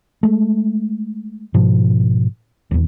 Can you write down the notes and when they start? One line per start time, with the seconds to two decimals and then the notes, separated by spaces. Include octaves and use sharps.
0.23 G#3 A3
1.54 G#2 B2 F3
2.71 D#1 E2